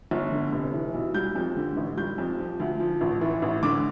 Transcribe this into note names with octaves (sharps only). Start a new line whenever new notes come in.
G1
D3
F1
E3
B1
G3 G6
F2
D3
A1
G3 G6
F2
F3
D2
F3
A1
E3
A1
D3 D6